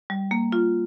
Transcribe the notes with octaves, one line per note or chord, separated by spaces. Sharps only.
G3
A#3
F4